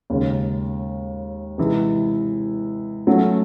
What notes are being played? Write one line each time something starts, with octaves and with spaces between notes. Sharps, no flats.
D#2 C#3 G#3
C3 E3 G#3
F#3 A3 C#4